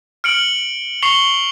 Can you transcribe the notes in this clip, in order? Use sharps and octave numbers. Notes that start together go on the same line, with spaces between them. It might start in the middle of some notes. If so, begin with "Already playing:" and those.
F6 C#7 D7 F#7
C#6 C7 C#7 F7 G7